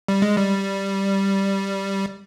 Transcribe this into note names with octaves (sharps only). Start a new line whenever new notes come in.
G3
G#3
G3